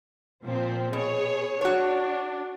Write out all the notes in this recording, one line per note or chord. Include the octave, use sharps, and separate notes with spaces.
A#2 F3 C4
B2 G#4 C#5
D4 F#4 C#5